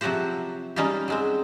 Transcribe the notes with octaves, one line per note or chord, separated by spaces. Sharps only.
C3 F3 F#3 F#4 G4 C5
G3 C#4 D#4 F4 G4
F#3 G#3 C4